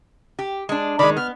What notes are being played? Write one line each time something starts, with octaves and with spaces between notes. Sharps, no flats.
G4
G#3 D4
D#3 G#3 D5 B5
B3 F6